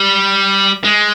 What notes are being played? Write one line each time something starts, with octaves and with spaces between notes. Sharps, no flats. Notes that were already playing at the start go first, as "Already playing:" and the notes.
Already playing: G3
G#3